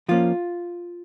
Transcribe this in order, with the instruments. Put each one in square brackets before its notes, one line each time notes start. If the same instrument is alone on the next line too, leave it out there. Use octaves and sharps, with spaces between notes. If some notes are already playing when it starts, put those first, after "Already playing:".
[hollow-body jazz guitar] F3 A#3 C#4 F4